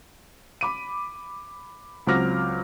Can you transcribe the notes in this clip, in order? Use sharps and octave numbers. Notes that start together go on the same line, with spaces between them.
B5 D6 D#7
C#2 F#3 C4 D6 F6 A#6